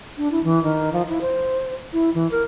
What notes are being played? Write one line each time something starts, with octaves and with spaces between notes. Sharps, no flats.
D4
E4
E3
D#3
F3
E4
C5
E4
E3
A#4